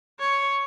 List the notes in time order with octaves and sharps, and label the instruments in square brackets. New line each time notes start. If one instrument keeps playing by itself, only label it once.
[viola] C#5